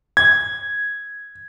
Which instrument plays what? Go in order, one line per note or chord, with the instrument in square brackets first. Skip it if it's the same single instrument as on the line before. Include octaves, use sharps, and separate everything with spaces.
[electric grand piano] G#6